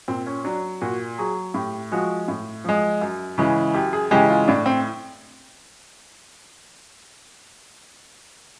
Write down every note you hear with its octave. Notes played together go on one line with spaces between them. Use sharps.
A#2 C4
C#4
F#3 D4
A#2 F#4
F#3 G#4
A2 G4
F3 G#3 F#4
A2
F3 G#3
F#2
C#3 E3 G#3
F#2 G4
G#4
C#3 E3 G#3 G4
F4
A2 D4
C4